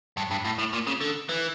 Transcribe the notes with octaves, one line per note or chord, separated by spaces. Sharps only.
G2
G2
A2
A2
A#2
C#3
D3
E3